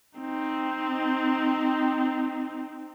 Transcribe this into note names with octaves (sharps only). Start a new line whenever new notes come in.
C4 D#4